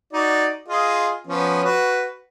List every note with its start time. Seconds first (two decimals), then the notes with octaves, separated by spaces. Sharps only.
0.13 D#4 F#4 D5
0.68 F4 G#4 D#5
1.27 F3 B3 C#4
1.64 F#4 B4